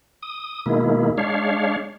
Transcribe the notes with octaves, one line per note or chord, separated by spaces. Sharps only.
D#6
B2 D#3 G#3 A#3 E4
G#3 D4 C#5 F5